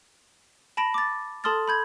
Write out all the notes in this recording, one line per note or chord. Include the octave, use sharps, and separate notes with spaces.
A5 B5 A#6 D7
D6 A6
A4 A5 C6 D#6 F6 A6
B5 G6 G#6